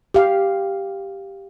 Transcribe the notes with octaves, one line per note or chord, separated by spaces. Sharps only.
G4 F5